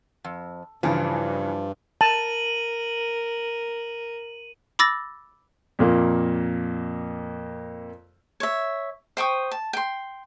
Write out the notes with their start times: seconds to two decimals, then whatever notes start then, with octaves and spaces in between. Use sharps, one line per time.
0.24 F2
0.83 G2 C#3 E3 F3 D4
2.01 A#4 A5 D#7 F#7
4.79 B5 D6 E6 A6 A#6
5.79 F2 A#2 A#3
8.40 C#5 E5
9.17 C5 G5 C#6 D#6
9.51 A5
9.73 G5 C6